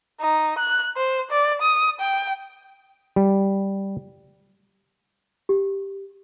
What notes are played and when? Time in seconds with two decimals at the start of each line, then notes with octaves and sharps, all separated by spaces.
0.21 D#4
0.58 F#6
0.96 C5
1.31 D5
1.61 D#6
2.00 G5
3.16 G3
5.49 G4